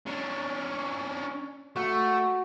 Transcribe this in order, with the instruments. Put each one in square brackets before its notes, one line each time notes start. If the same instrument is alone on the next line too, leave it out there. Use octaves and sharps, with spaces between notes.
[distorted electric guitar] C#4 D4
[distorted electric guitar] A3 [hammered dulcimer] F#4